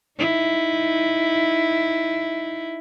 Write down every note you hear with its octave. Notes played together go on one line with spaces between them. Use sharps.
D#4 E4